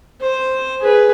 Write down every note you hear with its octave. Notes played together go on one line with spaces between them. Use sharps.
C5
G#4 B4